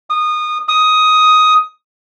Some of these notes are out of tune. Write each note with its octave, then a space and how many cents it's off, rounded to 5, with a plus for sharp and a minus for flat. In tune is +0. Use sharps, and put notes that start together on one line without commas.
D#6 -20
D#6 +10